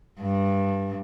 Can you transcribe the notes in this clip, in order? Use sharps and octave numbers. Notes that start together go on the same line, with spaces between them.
G2